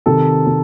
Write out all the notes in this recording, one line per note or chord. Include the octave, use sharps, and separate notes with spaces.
C3 D#3 A4
C3